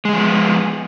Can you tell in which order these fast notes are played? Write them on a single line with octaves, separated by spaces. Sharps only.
G#3 G#4 F3 B3